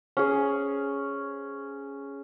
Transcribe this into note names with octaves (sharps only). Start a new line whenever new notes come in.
C#4 G#4